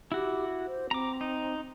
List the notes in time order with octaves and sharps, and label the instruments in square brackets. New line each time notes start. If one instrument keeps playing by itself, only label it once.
[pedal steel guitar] E4 F#4 [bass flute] G4
[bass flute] C5
[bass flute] C4 [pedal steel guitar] A#5 D6
[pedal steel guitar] D#4